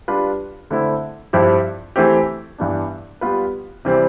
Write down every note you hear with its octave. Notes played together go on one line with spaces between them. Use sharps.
G3 D4 F4 B4
D3 A3 C4 E4
G2 F3 C4 E4 G4
E3 A3 C4 G4
G2 E3 B3 D4
G3 B3 F4 B4
C3 E3 G3 C4